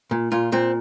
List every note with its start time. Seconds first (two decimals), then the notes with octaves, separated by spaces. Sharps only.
0.11 A#2
0.32 A#2 F4
0.52 A#2 C4